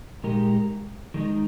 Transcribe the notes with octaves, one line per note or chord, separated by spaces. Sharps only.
A#2 G#3 D#4 G4 A#4
D#3 G#3 D#4